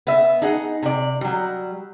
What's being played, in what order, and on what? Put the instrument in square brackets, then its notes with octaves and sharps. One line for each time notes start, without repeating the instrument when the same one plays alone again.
[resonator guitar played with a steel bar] B3 E5
D#4 G#4 F#5
C3 D5
F#3 G3